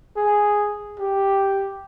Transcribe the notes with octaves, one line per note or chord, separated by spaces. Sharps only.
G#4
G4